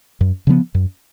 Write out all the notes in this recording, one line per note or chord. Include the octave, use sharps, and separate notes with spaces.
F#2
C#3 F3 B3
F#2